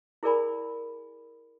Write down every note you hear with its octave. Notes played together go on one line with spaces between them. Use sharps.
E4 G#4 A#4 D5 G#5 B5